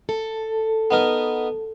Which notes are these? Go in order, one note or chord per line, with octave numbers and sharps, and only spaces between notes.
A4
B3 D#4 A#4